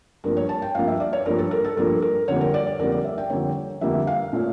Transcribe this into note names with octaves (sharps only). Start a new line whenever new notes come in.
G2 F3 A#3 A#4
C#5
A5
G5
G2 F3 A#3 F5
E5
D5
C#5
G2 F3 A#3 A#4
A4
A#4
A4
G2 F3 A#3 A#4
A#4
F2 D3 G3 A#3 C#5
A#4
D5
C#5
F2 D3 G3 A#3 A#4
D5
E5
G5
F2 D3 G3 A#3 C#5
F2 D3 G3 A#3 E5
F5
A#2 A3 C#4